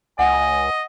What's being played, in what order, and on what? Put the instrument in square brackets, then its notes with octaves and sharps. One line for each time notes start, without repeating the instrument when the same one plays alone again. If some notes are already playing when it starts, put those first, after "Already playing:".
[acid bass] C#2 [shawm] D#5 [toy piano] F#5 [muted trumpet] G#5